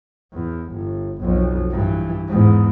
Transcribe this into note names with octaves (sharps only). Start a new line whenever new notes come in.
E2
G1
B1 F2
G2 E3
E2 G#2